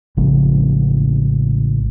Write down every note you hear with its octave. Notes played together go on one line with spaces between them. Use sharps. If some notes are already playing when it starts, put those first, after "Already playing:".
A1 C#3 F3 G#3